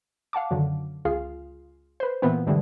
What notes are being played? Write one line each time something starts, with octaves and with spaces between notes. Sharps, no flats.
F5 F#5 A5 D6
F#2 D3 D#3 F#3
C#2 F4 G#4 F5
B4 C5
A#2 E3 B3 C4
G2 D3 E3 F3 G3 G#3